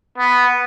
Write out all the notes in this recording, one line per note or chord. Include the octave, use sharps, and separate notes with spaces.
B3